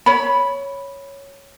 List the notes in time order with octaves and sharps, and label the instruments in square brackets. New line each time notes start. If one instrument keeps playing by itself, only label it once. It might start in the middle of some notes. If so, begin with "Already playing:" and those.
[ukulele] C#5 B5